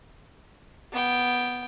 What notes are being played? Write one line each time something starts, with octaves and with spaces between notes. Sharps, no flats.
B3 G5